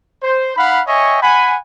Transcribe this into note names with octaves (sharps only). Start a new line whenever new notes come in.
C5
D#4 F5 F#5 B5
C#5 D#5 E5 G5 G#5 C#6
F#5 G#5 B5